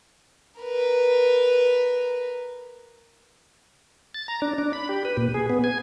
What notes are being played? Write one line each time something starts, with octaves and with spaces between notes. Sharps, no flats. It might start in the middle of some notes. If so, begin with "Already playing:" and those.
A#4 B4
A6
A#5
D4
D4
B5
G4
B4
A#2
G#4
B3
G#5